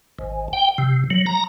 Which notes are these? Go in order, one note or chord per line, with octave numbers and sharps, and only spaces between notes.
G#1
G5
C3
F#3
A#5